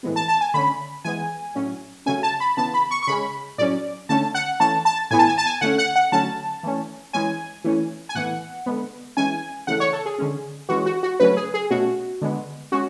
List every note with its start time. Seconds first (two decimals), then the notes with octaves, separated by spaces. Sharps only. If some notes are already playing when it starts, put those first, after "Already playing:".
0.03 A2 E3 G#3 B3
0.16 A5
0.28 A5
0.41 G#5
0.54 D3 A3 C#4 B5
1.04 E3 G#3 B3 G#5
1.55 A2 F#3 C#4
2.06 C#3 F#3 A3 C#4 G#5
2.23 A5
2.40 B5
2.57 C#3 E3 B3 A5
2.74 B5
2.91 C#6
3.03 C#6
3.07 C#3 G#3 C#4 B5
3.58 A2 F#3 C#4 D5
4.09 D3 A3 C#4 A5
4.35 F#5
4.60 E3 A3 C#4 A5
4.85 A5
5.11 A2 E3 B3 G#5
5.19 A5
5.29 G#5
5.38 A5
5.46 G#5
5.61 D3 A3 C#4 F#5
5.78 F#5
5.96 F#5
6.12 D3 F#3 A3 C#4 A5
6.63 E3 A3 C#4
7.13 E3 G#3 C#4 G#5
7.64 E3 A3 C#4
8.09 G#5
8.15 A2 E3 B3 F#5
8.66 D3 G#3 B3
9.17 E3 G#3 C#4 G#5
9.67 C#3 E3 A3 F#5
9.80 C#5
9.93 A4
10.06 G#4
10.18 D3 G#3 C#4
10.69 E3 G#3 C#4 F#4
10.86 F#4
11.03 F#4
11.20 C#3 F#3 A3 C#4 B4
11.36 G#4
11.54 G#4
11.70 B2 A3 C#4 F#4
12.21 D3 G#3 B3
12.72 G#3 C#4 F#4